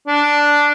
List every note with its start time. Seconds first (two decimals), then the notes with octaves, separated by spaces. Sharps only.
0.07 D4